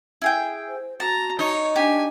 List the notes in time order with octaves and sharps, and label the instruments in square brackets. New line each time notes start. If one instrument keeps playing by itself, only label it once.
[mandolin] E4 G#4 G5
[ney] C5
[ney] F#4 [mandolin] A5 [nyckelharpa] A#5
[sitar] D#4 [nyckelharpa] C#5
[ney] D4 [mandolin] G4 [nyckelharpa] G#5